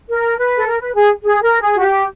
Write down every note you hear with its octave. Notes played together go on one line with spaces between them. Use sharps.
A#4
B4
A4
A#4
B4
G#4
G#4
A#4
G#4
F#4
G4